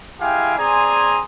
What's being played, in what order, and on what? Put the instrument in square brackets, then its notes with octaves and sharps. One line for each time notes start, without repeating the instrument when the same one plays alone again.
[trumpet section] G#3 E4 G4 F5 G5 G#5
C4 G#4 D5 G#5 A#5 C6